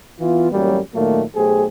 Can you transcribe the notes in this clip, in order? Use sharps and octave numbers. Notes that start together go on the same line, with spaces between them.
E3 B3 F4
A1 F#2 F#3 G3 A#3
A#2 D#3 F#3 A3 A#3
B1 A3 G4 G#4 C5